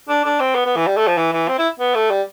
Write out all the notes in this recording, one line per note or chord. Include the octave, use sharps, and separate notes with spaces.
D4
D4
C4
B3
B3
E3
G3
A3
F3
E3
E3
C4
E4
B3
A3
G3